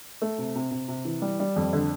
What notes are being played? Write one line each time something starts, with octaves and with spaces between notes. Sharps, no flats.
A3
C3
C3
C3
C3
E3
G3
G3
F2
D3